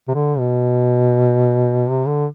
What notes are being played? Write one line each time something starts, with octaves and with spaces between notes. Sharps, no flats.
C3
D3
B2
C3
D3